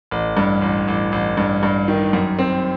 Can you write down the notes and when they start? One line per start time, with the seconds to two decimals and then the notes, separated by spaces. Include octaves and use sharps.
0.11 A1
0.37 G2
0.62 A1
0.88 A1
1.12 A1
1.37 G2
1.63 G2
1.88 D#3
2.13 F#2
2.39 C4